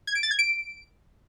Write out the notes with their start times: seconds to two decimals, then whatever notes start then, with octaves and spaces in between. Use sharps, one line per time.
0.07 G#6
0.15 D7
0.23 A6
0.31 G#6
0.39 D7